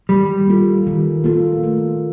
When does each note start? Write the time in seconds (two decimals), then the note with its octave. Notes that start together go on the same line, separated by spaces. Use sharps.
0.09 D#3 G3
0.47 A#3 F4 A4
0.87 D#3
1.24 A#3 F4 A4
1.63 A3